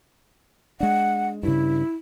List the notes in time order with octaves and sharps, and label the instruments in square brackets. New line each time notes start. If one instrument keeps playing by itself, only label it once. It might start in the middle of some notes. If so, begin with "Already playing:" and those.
[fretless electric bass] G#3 D4 [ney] F#5
[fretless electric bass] G2 C#3 [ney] E4